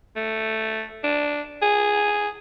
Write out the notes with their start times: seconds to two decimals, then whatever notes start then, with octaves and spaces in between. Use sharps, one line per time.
0.16 A3
1.04 D4
1.62 G#4